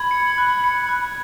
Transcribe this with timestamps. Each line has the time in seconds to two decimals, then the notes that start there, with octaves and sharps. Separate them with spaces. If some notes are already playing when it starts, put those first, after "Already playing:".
Already playing: B5 G#6
0.11 C#7
0.38 F#6
0.64 C#7
0.89 F#6